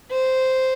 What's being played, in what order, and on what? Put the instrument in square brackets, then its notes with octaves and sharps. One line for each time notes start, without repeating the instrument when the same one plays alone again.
[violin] C5